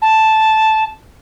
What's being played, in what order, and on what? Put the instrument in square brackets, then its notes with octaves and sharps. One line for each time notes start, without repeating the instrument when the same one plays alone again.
[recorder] A5